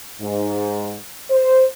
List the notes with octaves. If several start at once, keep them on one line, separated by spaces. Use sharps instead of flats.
G#2
C5